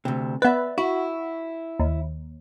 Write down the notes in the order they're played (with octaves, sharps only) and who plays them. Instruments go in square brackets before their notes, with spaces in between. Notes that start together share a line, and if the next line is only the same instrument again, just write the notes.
[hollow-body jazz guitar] D2 C3
[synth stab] B3 B4 [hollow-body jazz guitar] D5 E5
[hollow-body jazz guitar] E4 [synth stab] F#4
[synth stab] D#2